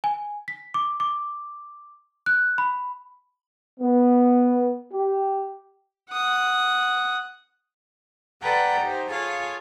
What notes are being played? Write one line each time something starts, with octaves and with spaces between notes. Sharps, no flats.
G#5
B6
D6
D6
F#6
B5
B3
G4
F#5 D#6
A4 B4 D5 F#5 G5 A#5
D#4 G4 C5
F4 G#4 A4 C#5 F5